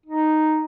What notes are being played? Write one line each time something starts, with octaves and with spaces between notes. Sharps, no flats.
D#4